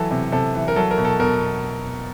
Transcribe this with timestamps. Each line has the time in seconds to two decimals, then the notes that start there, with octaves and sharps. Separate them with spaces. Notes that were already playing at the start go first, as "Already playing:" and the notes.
Already playing: E3 F#3 A4
0.11 C3
0.32 C3 A4
0.54 E3
0.68 A#4
0.76 F#3 A4
0.91 A#4
0.97 B2
1.05 A4
1.20 B2 A#4